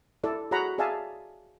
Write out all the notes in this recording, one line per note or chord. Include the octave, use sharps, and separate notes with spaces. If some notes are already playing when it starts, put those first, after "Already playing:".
E4 A4 D5
F#4 G#4 C#5 F#5 A#5 B5
G#4 D5 E5 F5 G#5 A5